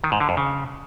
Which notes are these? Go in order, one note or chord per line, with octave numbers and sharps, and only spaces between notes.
D#3
G#2
D3
F2
C#3